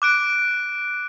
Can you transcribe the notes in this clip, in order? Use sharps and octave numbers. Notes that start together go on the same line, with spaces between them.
D6 F#6 D7